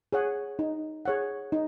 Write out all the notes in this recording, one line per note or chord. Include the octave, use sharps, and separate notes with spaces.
G#4 C#5 F#5
D#4
G#4 C#5 F#5
D#4